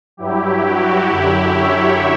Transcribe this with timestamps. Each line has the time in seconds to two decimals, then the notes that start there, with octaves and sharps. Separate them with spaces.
0.17 G2 F#3 E4 G4
0.62 F#4
1.08 F#2 D3 F#3 E4 G4
1.53 C#5 E5